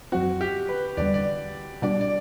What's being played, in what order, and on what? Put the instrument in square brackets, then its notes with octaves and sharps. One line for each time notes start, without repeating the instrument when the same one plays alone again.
[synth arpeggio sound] F#2 F#3 C4 [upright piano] F#4
[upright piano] G4
B4
[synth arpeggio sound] E2 D3 G3 [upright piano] D5
[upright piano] D5
[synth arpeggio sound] B2 G3 D4 [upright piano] D5
[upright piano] D5